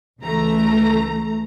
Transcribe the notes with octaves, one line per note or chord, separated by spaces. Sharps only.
C#2 E3 A3 A#5